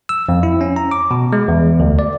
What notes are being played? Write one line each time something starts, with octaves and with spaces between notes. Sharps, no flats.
E6
F2
E4
C#4
A#5
D6
B2
G#3
E2
D2
D5